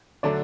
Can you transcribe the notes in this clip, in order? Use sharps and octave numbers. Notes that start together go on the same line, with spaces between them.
D3 F#3 A3 D4 D5